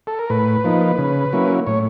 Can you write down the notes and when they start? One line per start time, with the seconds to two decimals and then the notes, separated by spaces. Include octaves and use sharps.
0.07 A4
0.19 A#4
0.30 A2 B4
0.64 F3 A#3 D#4
0.98 C#3
1.33 F#3 A#3 C#4 E4
1.67 A2 C#5